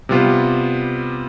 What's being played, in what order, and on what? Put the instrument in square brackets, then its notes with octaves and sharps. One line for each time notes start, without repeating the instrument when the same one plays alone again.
[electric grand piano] C3 G3 B3 F4